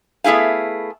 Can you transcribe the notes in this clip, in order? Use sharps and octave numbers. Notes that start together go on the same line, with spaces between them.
A3 B3 E4 G#4 F5